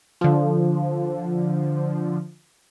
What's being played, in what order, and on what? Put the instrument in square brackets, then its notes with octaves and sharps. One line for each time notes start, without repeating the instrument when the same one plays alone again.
[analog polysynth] D3 F3